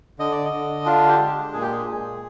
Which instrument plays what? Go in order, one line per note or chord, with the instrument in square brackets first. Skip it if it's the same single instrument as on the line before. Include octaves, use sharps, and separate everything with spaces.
[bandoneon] D3 D#5
D5
D#5
D3
D4 F4
G4
G#3
A#2 G#4
G4
G#4
A#2